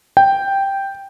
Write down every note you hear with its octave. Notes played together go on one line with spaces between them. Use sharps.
G5